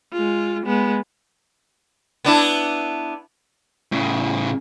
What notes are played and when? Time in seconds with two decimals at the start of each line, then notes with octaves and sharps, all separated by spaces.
0.12 G#3 F4
0.64 G#3 B3
2.25 B3 D4 E4
3.92 A2 C#3